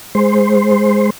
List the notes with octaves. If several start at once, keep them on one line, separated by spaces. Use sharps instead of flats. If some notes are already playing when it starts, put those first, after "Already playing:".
G#3 C5